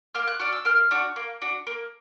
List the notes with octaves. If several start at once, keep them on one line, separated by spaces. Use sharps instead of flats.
A#3 F6
F#6
D4 F#4 F6
E6
A#3 F6
D4 F#4
A#3
D4 F#4
A#3